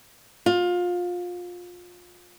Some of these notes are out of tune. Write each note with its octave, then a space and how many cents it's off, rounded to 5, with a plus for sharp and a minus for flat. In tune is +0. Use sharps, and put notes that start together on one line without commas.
F4 +25